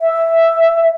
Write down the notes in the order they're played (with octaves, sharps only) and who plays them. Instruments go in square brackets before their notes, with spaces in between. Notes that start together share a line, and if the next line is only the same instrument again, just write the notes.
[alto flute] E5